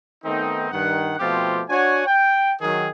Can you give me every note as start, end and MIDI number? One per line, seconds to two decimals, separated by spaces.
0.25 0.71 51
0.25 0.71 57
0.25 0.71 59
0.25 0.71 60
0.25 0.71 63
0.72 1.15 43
0.72 1.15 51
0.72 1.15 78
1.19 1.63 47
1.19 1.63 53
1.19 1.63 57
1.19 1.63 60
1.19 1.63 65
1.19 1.63 67
1.69 2.05 62
1.69 2.05 66
1.69 2.05 73
1.69 2.05 78
1.69 2.05 80
2.07 2.53 79
2.61 2.88 51
2.61 2.88 54
2.61 2.88 68